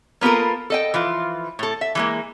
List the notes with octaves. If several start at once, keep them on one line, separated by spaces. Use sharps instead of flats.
A#3 B3 F4 A4 A#4
A4 D#5 G5
E3 F3 F4
A2 A4
E5
E3 G#3 A#3